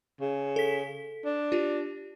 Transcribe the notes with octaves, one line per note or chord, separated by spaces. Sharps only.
C#3
A4 B6
D4
F4 G4